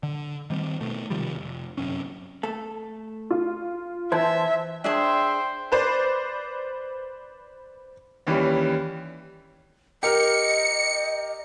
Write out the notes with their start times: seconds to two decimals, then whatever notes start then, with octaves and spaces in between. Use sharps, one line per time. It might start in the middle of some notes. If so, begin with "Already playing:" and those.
0.03 D3
0.50 D#3 G3 C4
0.81 B2 A3
1.10 C3 D#3 F3 G3
1.34 F1
1.77 G1 F#2 C3 C#4
2.43 A3 A4
3.31 F4
4.12 E3 C5 E5 A5 G#6
4.84 D4 G#4 C5 E5 G5 A5
5.72 B4 C5 D5
8.27 D#2 E3 G3 C#4
10.03 G4 A#4 D#5 F6 C#7